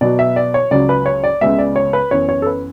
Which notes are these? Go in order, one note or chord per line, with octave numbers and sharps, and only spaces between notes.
B2 F#3 B3 D5
E5
D5
C#5
C#2 C#3 F#3 D5
B4
C#5
D5
C#2 C#3 G#3 B3 E5
D5
C#5
B4
F#2 E3 B3 C#5
C#5
A4
B4